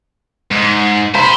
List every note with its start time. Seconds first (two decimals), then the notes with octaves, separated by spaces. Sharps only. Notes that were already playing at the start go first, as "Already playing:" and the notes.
0.51 G#2
1.15 G4 C5 B5